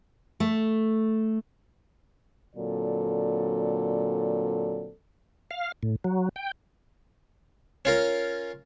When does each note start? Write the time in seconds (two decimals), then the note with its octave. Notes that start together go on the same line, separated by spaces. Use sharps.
0.40 A3
2.56 A#2 D3 F#3 C4 A4 D5
5.51 F5
5.83 A2
6.04 F#3
6.36 G5
7.85 C#4 F4 A#4